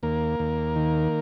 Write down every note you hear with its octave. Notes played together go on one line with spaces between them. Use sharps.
D#2 A#3 A#4
D#2
D#3